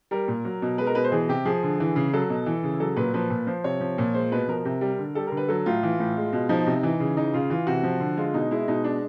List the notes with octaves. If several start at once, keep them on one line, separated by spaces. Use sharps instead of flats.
G3 A#4
A#2
F#3
B2
G#3 B4
A#4
B2 B4
C5
E3 G#4
C3 G4
F3 G#4
D3
E3
C#3
F#3 A4
B2
E3
C#3
F#3 A4
A#2 B4
F3 B4
A#2
F3 C5
C3 C#5
F3
A#2
G#3 C5
B2 B4
F3 A#4
C3
G3
D3
G3 A4
D3 A#4
B4
F#3 A4
A2 F4
E3
A2
G#3
B2
F3 D#4
C3
E3
C#3
E3 D#4
C#3 F4
E3 F4
C3 F#4
F3
D3
G#3 F4
B2 D#4
G#3 E4
B2 D#4
G#3 D4